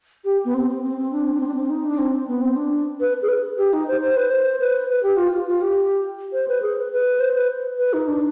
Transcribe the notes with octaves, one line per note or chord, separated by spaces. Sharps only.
G4
B3
C4
C4
C4
C4
D4
C4
D4
C4
D4
C4
D#4
D4
C4
B3
C4
D4
B4
G#4
B4
G4
D#4
C5
C5
B4
C5
B4
B4
G4
F4
F4
F4
G4
C5
B4
G#4
B4
B4
C5
B4
B4
D#4
D4